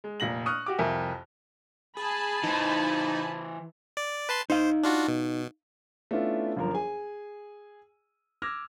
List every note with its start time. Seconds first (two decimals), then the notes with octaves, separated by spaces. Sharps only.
0.04 G#3
0.20 F1 A#2 A#6 F#7
0.46 C#6 D#6 F6 F#6
0.66 F#4 G4 D6
0.78 C2 F2 A#4 E5 G#5
1.97 G#4 G#5 A5 B5
2.44 E3 D#4 C5
3.97 D5
4.29 B4 A5 C6
4.50 D#4 C5 F5
4.83 D4 F4 F#4
5.08 B2
6.11 A3 B3 C#4 D4 E4 F4
6.56 G1 F#2 F3 A#4 A#5
6.74 G#4 G#5
8.42 D6 E6 F6 G#6 A#6